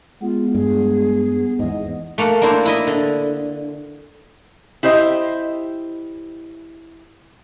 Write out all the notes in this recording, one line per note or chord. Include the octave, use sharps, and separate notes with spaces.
G#3 B3 F4
G2 G#4
E2 G#2 D#5
A3 A#3 F5 F#5
A#3 D4 E4 C5
E4 D#5 E5
D3
E4 G4 C5 D#5